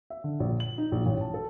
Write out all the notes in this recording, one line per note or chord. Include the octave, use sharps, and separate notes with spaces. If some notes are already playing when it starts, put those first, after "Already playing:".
E5
D3
A#1
F#7
D#4
A#1
A1
A5
A4